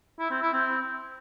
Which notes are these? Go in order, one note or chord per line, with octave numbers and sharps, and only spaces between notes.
E4
C4
E4
C4